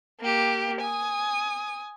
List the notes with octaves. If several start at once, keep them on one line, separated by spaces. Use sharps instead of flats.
A#3 G4
G#5 D#6